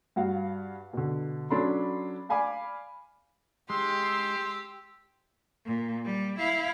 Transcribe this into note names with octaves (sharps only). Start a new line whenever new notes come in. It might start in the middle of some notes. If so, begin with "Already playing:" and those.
G2 F#4 F5 F#5
B2 D3
F#3 C#4 D4 A4 B5 C6
D5 F5 G#5 B5 D6
G#3 G4 C6 E6
A#2
G3
E4 F5